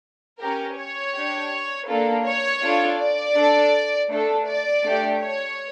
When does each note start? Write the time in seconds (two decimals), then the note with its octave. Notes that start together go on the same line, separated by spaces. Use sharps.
0.40 C#4 G4 A#4
0.77 C#5
1.14 D4 G4
1.88 A#3 D4 F4 A4
2.24 C#5
2.62 D4 F4 A4
2.98 D5
3.35 D4 A4
4.09 A3 D4 A4
4.46 D5
4.83 A3 D4 G4
5.20 C#5